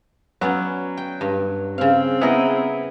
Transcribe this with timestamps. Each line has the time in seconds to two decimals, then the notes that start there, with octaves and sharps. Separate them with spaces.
0.41 F#3 B3 C#4 D5
0.97 G5
1.21 G2
1.78 C#3 C4 F5
2.21 B3 E4 G#4 A#4 D#5